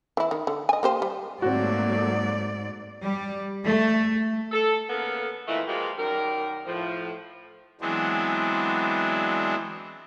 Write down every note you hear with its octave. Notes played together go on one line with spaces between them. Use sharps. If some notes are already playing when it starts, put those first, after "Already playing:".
E3 E4
D#3
D3
D#5 G#5
A#3 G4 C5
G3
G#2 F#3 A3 A#3 C4 F#4 D5
G3
A3
A4
C#3 A#3 B3 A4
F2 A#2 E3 A3 E4 D#5
F3 G3 G#3 A#3 F4 F#4
F#2 D#3 G3 A#4
A2 F3
E3 F#3 G#3 B3 C4 D4